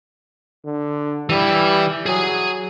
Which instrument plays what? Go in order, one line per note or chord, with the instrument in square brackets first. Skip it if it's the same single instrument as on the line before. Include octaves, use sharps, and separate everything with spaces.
[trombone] D3
[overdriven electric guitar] E3 E4 [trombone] G3
[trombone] F#3 [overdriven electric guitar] G#4 G#5